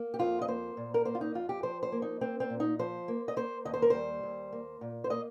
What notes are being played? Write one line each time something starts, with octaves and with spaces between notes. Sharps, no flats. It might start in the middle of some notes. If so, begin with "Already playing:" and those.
Already playing: A#3
G4
F2 F4
D#5
A#3 C5
A#2
A#4
A#3 C5
F4
D#4
F2 F4
G4
F3 C5
C5
A#3
D#4
A#3 C4
C4
A#2
D#4
F3 C5
A#3
D#5
A#3 C5
D#2 D#5
C5
A#4
G3 C5
D#2
A#3
A#2
C5
A#3 D#5